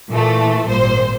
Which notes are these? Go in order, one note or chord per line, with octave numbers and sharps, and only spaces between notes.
A#2 E3 A3
G#1 A#2 G3 C5